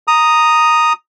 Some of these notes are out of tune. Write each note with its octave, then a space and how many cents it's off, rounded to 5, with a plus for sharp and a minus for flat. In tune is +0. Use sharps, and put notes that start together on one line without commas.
A#5 +0 D#6 +0